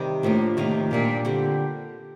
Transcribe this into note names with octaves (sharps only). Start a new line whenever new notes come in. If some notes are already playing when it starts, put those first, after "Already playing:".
Already playing: C3 D#3 G3
A2 F3 A#3 D4
A2 C3 D#3 A#3 F4
A#2 G3 D4 G4
D3 G3 C4 G4